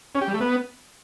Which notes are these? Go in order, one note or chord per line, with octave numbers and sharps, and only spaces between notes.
C#4
G4
G3
A3
B3